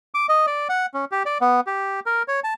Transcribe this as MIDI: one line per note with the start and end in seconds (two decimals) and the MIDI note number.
0.14 0.26 86
0.29 0.46 75
0.47 0.68 74
0.69 0.86 78
0.94 1.05 61
1.11 1.23 67
1.26 1.38 74
1.41 1.60 59
1.67 2.00 67
2.06 2.23 70
2.28 2.40 73
2.44 2.54 81